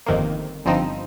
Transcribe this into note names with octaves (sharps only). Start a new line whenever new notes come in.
G1 F2 C3 D#3 A#3
G1 G2 F3 C4 D#4